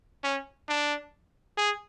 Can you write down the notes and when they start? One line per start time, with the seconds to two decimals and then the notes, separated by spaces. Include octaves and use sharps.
0.24 C#4
0.68 D4
1.57 G#4